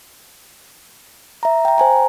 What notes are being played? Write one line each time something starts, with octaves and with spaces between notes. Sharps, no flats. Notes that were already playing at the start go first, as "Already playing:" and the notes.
E5 A#5
G5 A#5
C5 G#5 A#5